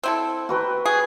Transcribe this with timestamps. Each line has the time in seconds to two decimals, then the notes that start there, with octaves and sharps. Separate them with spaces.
0.03 C4 E4 A4
0.49 F#4 B4 G5
0.86 G#4